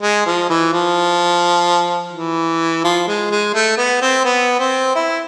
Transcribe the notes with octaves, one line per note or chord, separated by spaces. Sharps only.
G#3
F3
E3
F3
E3
F3
G#3
G#3
A3
B3
C4
B3
C4
E4